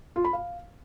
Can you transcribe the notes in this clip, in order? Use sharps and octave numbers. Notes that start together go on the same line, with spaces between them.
F4
B5
F5